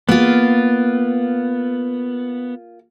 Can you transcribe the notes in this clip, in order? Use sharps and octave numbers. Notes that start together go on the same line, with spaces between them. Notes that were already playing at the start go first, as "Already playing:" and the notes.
A#3 B3 F4